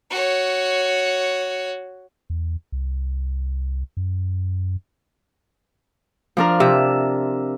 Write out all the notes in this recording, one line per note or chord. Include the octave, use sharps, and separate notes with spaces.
F#4 C#5
E2
C2
F#2
F3 D4 A#4
C3 E5